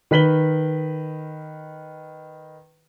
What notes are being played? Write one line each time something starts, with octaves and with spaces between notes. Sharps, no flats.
D#3 B4 B6 F#7 G7